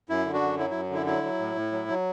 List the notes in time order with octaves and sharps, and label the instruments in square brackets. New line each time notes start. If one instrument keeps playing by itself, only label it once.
[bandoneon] F#2 E4
D3
D4 F#4
F#2
F#3 E4
F#2 E4
D3 E4
F#3 E4
F#3
A2
A2
F#3
F#3